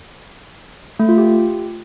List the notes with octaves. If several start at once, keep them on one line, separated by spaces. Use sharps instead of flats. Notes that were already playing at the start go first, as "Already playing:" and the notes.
A3
F4
G4